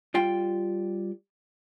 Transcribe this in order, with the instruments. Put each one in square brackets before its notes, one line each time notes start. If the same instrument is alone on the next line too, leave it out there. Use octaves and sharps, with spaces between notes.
[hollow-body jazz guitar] G3 F4 G5